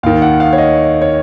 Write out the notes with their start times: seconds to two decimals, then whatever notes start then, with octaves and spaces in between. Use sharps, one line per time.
0.03 D#2 D#3 F5
0.22 F#5
0.40 F5
0.53 C#5
0.58 D#5
1.02 C#5